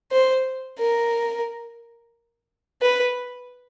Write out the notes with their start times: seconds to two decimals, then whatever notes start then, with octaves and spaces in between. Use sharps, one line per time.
0.12 C5
0.80 A#4
2.82 B4